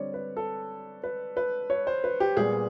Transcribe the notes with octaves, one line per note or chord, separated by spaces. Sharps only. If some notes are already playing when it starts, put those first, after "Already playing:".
Already playing: D3 G3 C4 C#5 D5
B4
A4
B4
B4
C#5
C5
B4
G4
A#2 G3 B3 G#4